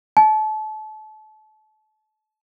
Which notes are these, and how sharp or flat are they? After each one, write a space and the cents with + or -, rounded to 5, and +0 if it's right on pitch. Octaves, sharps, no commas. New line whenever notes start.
A5 -30